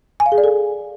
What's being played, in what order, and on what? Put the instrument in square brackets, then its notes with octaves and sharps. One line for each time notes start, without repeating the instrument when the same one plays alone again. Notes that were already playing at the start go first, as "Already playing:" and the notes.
[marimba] G#5
F5
G#4
D5
A4